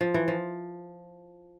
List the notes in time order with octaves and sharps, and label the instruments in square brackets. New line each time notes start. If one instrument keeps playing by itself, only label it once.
[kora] F3
E3
F3